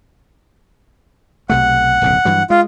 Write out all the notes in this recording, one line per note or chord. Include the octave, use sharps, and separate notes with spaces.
B1 C3 A3 F#5
D1 B1 C#3
G2 E3 F#3
G#3 F4